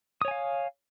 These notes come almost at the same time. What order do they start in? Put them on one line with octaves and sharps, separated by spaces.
D#6 C#5 G#5 F5